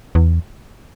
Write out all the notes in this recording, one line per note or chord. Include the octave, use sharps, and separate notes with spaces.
E2